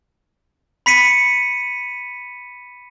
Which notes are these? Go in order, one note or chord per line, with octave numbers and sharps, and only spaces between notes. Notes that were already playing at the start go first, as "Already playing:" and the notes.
B5 B6 C#7 D#7